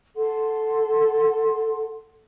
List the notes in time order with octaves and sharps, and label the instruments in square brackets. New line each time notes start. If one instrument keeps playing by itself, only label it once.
[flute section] A4 F#5 C6